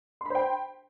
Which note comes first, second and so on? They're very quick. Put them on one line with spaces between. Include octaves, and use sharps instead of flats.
C6 B5 C5 G5